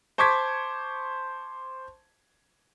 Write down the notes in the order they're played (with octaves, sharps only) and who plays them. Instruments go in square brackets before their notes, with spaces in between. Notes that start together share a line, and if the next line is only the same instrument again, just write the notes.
[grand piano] C5 A5 C#6 D6 G#6 B6